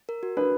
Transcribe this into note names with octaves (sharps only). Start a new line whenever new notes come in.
A#4
F#4
D4 B4